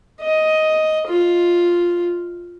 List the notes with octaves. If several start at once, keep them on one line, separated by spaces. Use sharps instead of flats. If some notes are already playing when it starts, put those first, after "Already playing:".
D#5
F4